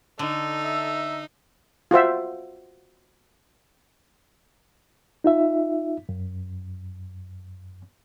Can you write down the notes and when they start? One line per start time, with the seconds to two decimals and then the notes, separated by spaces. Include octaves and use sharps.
0.19 D3 D#4 A4
0.64 E5
1.91 F4 F#4 C5 E5
5.24 D#4 F4 E5
6.09 F#2